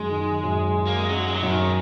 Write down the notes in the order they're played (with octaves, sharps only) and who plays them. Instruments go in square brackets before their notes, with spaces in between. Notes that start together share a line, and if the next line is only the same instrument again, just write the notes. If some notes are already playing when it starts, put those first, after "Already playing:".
Already playing: [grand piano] F#2 D#3 [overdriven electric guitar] G#3
[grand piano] D#3
F#2
F#2
[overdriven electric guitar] A#3
G#3
[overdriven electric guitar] F#3 [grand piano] C#4
[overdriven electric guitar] G#3
F#3
[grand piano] F#2 [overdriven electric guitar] D#3